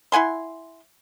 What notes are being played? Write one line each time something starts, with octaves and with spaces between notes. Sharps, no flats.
E4 F#5 G#5 C6